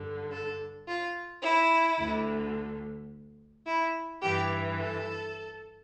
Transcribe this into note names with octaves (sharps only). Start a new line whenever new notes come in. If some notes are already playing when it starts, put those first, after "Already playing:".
Already playing: G2 D3
A4
F4
E4
D2 D3
E4
G2 E3 G4
A4